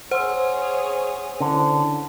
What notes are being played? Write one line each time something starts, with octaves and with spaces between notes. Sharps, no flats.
G#4 C5 C#5 F#5 C6 E6
D3 C#4 E4